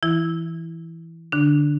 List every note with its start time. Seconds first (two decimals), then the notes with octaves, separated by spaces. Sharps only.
0.03 E3 E4
1.32 D3 D4